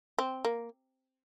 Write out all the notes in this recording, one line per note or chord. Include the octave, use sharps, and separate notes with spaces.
C4
A#3